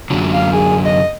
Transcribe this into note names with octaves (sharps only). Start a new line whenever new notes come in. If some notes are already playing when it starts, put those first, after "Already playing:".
F#2 D3 F#3
F5
G#4
D#5